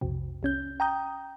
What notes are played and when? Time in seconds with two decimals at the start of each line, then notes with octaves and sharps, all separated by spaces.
0.01 B1 F2 C3
0.43 C2 C#4 G6
0.80 G5 A#5 D#6 G6